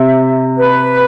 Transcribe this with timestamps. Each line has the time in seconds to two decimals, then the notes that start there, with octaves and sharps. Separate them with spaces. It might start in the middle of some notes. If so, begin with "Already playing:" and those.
Already playing: C3 E5
0.58 B4